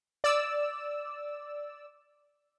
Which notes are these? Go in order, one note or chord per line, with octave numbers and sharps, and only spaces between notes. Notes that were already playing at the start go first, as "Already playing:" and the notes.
D5 E6